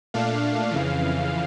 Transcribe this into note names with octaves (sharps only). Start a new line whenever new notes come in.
A#2 A3 D4 F5
F2 C#3 E3